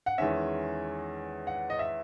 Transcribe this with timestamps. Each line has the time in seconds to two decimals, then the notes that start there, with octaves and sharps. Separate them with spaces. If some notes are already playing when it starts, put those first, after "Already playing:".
0.06 F#5
0.18 E2 D#3 G#3 C#4 E5
1.47 F#5
1.70 D#5
1.79 E5